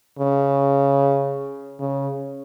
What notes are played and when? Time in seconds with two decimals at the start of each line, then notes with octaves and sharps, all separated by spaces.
0.19 C#3
1.80 C#3